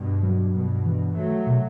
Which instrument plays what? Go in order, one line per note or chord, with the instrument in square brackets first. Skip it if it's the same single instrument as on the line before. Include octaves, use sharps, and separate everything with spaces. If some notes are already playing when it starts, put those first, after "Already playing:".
Already playing: [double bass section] G2 B2
[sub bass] F#3
[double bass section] G2 B2
[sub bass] E3
[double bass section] F#3 A3
[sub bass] B2